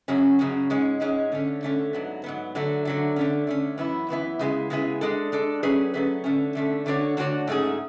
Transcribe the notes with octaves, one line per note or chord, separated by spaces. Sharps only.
F#2 C#3 F#3 C#4
F#2 C#3 F#3 C#4
G#2 G#3 C#4
G#2 G#3 C#4
D3 A3 C#4
D3 A3 C#4
G#2 F#3 B3
G#2 F#3 B3
D3 F#3 A3
D3 F#3 A3
D3 A3 C#4
D3 A3 C#4
F#2 E3 B3 E4
F#2 E3 B3 E4
C#3 G#3 B3 E4 G#4
C#3 G#3 B3 E4 G#4
G#3 D4 A4
G#3 D4 A4
F#3 A3 C#4 G#4 B4
F#3 A3 C#4 G#4 B4
D3 A3 C#4
D3 A3 C#4
D3 A3 D4 F#4 C#5
D3 A3 D4 F#4 C#5
G#2 F#3 A3 C#4 G#4